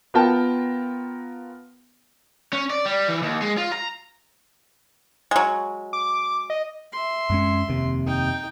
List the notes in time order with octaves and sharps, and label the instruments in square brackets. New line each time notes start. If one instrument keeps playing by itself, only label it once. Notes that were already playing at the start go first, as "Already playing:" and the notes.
[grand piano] B3 F4 A#4 G5 A5
[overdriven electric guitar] C#4
D5
G3
E3
D#2
G#3
F4
A#5
[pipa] F#3 G#3
[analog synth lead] D6
D#5
[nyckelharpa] E5 C6
[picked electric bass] F#2 G#3 C#4
F1 D#2 C3
[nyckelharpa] D#4 G5